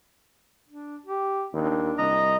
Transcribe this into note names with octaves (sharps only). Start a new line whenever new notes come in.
D4
G4
D#2 D4
C2 D#5 A#5